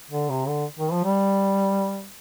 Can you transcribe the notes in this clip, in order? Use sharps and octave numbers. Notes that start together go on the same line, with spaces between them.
D3
C3
D3
D#3
F3
G3